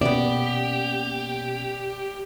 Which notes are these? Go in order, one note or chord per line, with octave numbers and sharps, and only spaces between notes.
B2 A#3 B3 C#4 G4 D5 E5